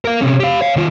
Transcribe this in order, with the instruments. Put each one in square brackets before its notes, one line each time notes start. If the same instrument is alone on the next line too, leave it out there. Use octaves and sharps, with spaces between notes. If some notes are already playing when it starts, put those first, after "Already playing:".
[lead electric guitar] A#4 F5
C3 C#4
G4 F5
C#5 F5
D#3 F4